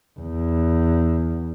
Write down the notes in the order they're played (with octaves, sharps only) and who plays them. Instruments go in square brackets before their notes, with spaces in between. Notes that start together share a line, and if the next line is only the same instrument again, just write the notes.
[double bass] E2